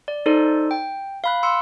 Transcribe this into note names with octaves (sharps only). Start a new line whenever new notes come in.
D5
D#4 A4 C5 D5
G5
F5 B5 F#6
C6 E6 C#7